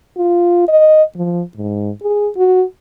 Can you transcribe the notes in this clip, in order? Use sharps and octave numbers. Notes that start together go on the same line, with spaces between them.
F4
D#5
F3
G#2
G#4
F#4